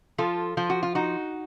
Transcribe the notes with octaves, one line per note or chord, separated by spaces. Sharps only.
F3 F4 A4
F3 F4
F#4
F4
D#4 F#4